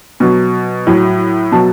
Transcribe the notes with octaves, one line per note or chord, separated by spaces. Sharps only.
B2 F#3
A2 F#3
B2 F#3 A5